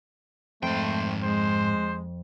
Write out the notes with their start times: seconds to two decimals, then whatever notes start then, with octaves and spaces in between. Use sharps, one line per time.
0.63 F2 G#2 A3 C5 G5
1.23 G#3 C5